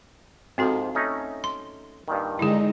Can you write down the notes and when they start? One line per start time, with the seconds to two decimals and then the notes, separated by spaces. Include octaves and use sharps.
0.58 G#2 F3 C4 F#4 A4
0.95 A3 C#4 D#4
1.44 C6
2.08 G2 A#2 D#3
2.39 D3 G#3 D#4 E4 G#4